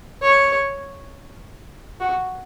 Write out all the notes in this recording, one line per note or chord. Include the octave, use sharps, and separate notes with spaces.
C#5
F#4